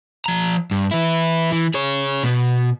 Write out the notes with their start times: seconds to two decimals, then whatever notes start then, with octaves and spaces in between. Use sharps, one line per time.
0.26 F3 A#5
0.71 G2
0.91 E3 E4
1.52 E3
1.74 G#4 C#5
2.23 B2 B3